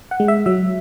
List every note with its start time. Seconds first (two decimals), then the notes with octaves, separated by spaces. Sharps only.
0.11 F#5
0.20 G#3
0.28 E5
0.46 F#3 E5